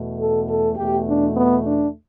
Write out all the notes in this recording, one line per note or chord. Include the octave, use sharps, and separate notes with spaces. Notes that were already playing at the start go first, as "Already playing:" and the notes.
Already playing: E2 B2 A3
A4
A4
E2 B2 A3 G4
D4
B3
D4